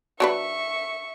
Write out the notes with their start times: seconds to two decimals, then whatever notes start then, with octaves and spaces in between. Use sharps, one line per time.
0.20 F#3 D4 B4 E5 C#6